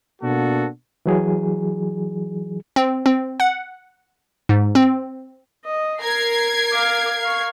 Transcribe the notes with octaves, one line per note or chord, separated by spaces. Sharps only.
B2 A#3 B3 D4 F#4 A4
E3 F#3 G#4
C4
C4
F#5
G#2
C4
D#5
A#4 A#5 G#6 C7
F5 D6
F5 C#6